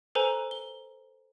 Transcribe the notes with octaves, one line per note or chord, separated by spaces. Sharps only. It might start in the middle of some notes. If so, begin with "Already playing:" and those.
A4 B4 C5 G#5 A#5
G7